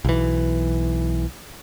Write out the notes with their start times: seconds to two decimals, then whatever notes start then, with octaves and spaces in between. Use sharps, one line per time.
0.05 B1 E3